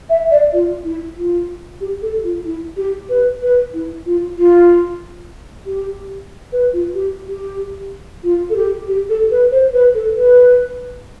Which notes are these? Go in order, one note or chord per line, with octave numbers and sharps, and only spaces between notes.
E5
D5
F4
E4
F4
G4
A4
F4
E4
G4
B4
B4
E4
F4
F4
G4
B4
F4
G4
G4
F4
A4
G4
G4
A4
B4
C5
B4
A4
B4